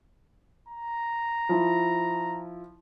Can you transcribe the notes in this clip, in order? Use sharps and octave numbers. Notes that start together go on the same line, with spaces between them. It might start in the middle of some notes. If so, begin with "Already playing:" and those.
A#5
F3 E4